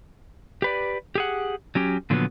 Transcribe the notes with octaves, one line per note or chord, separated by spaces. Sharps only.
G4 B4 D5
G4 G#4 F#5
F#3 C#4 G4
A#2 D3 F3 F#3 A#3 B3